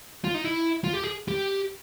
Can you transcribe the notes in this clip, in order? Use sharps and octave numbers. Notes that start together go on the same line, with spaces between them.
F4
D#4
E4
F4
G4
G#4
G4